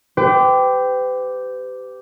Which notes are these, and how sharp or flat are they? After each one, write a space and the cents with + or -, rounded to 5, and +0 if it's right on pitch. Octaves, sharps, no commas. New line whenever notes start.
G4 -5 B4 +45